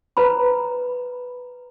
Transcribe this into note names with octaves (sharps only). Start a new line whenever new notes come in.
B4 C5 A#5 B5